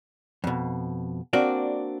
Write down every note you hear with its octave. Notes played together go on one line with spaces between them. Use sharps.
F2 B2
A#3 C4 D4 F#4 D5